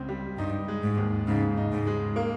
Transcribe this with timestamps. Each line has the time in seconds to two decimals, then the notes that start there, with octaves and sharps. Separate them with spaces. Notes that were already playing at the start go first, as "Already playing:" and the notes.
Already playing: C#2 C#3 C4
0.09 G3
0.38 G2 D#4
0.68 G#3
0.83 G#2
0.98 D#2
1.27 G#2 C#3
1.57 D#4
1.72 G#2
1.87 G#3
2.16 A#3